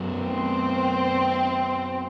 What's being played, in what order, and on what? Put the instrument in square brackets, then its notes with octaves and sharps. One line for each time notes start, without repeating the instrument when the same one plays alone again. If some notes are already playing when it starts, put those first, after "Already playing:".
Already playing: [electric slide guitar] F#2 F#3 B3
[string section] C4